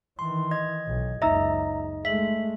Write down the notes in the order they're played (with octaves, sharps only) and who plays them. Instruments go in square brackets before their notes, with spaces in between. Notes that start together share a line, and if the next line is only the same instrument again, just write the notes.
[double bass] D#3 E3 [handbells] C6
[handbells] D#5 G#6
[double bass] B1
[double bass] F#1 C#2 [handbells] D#4 D#5 [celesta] E5 A#5 E6
[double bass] G#3 A3 [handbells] E5 [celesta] B6 F#7